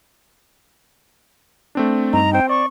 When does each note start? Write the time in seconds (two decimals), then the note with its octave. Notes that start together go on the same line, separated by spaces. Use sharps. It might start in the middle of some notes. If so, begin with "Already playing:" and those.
1.75 A3 C4 D4
2.13 G2 D#4 A#5
2.33 C4 C5 G5
2.49 D5 C#6